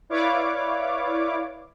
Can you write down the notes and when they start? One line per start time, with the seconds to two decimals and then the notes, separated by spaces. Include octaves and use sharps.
0.10 E4 B4 C#5 D5 F5 D6